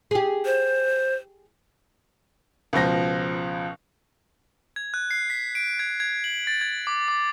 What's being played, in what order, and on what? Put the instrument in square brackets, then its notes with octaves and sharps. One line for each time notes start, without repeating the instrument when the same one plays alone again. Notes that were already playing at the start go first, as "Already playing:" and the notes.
[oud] G4 G#4
[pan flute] C5
[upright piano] C#2 B2 F3 A#6
[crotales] G#6
F#6
C7
B6
D7
G#6
G#6
F#7
A6
G#6
D6
D6